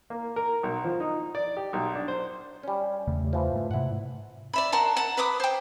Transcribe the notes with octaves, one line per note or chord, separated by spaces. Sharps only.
A#3
A#4
B1
F3
D#4
D5
G4
B1
D4
C5
G3 C#4
E2 C#3 A3
E3 F3
G#2 A3
G#2 C3 E4 F#5
D5 E5 B5
A#4 F#5 A5 C6
F#5 A5
B4 B5 D6 D#6
C5 G5